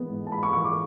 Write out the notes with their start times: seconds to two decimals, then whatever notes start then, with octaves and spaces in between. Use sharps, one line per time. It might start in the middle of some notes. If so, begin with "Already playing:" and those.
Already playing: E3 G#3 B3
0.09 G#2
0.27 A5
0.32 G#3 B5
0.43 C#6
0.53 E3 C#6
0.64 D6